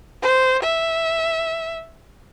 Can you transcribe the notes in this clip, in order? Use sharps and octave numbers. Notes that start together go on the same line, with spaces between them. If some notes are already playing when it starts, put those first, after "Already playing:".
C5
E5